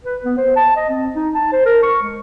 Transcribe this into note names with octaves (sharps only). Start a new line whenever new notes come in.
B4
B3
C5
A5
D#5
C4
D#4
A5
C5
A#4
C#6
G#3